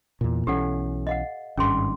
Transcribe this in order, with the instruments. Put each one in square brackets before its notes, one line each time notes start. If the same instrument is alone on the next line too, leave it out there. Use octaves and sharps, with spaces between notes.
[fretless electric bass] E2 A#2
[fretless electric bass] B1 E3 C#4 [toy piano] G4 A4 F#5
[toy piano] D#5 F5 F#5
[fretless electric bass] G#1 G2 [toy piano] C#4 G#4 C6